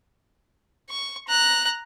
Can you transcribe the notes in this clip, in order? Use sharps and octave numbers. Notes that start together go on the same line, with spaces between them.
C#6
A#5 F#6